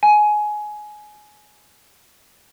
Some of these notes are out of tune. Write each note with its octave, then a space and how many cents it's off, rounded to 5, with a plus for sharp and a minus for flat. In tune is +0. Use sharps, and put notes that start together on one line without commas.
G#5 +20